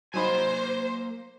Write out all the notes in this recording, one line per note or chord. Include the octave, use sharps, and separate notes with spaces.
F#3 A#3 D#4 C5 G#5 B5